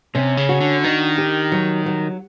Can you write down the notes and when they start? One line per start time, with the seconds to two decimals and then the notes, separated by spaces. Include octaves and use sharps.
0.15 C3 C#4
0.37 C#3
0.49 F#4
0.60 D3
0.84 D#3 D4
1.18 G4
1.52 F#3
1.86 F#3